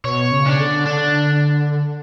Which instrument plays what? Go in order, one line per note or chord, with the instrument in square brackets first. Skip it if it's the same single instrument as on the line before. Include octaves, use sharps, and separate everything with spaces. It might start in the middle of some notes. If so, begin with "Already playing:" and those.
[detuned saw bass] B2 [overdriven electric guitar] C#5
[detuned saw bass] C#3
[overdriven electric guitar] D4
[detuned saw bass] D3
[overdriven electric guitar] D4